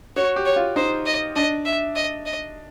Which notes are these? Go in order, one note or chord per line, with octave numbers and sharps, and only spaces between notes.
F#4 C#5
G4
C#5
F4
D#4 C5
D#5
D4 D#5
E5
D#5
D#5